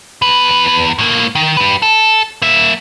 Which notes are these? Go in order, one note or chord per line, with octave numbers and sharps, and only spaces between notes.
E2 B4
A2 A#3
D#3
G4 B4
A4
A#3 E5